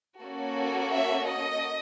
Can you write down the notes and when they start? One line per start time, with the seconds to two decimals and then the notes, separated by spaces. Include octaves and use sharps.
0.20 A#3 C#4 F#4 A4
0.92 E5
1.27 D#5